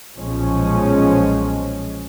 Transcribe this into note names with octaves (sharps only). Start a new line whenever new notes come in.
B1 A#2 F3 G#3 C#4